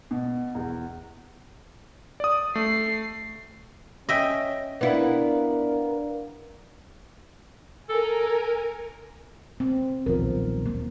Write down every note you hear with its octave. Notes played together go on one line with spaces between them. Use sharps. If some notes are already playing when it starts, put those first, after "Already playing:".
B2
E2
D5 D#6
A3 C7
C#4 D#5 E5 G5
B3 D4 E4 A#4 D5 F5
A4 A#4 G#5
C4
D#1 B1 F3 A#4
A#3